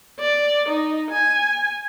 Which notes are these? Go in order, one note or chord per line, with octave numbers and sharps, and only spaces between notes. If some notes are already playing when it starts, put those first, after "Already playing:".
D5
D#4
G#5